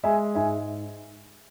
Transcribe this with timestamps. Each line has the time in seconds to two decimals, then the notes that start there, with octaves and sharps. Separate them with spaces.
0.04 G#3 E5 G#5
0.35 G#2 E5 G#5